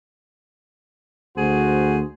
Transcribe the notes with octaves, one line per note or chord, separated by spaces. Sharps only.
D2 F#4 G#4 C5